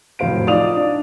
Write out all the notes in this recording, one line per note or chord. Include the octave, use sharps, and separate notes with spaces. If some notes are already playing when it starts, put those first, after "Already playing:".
F1 A2 F#3 C5 F5 D7
D#4 F4 D5 F5 D#6 F7
D4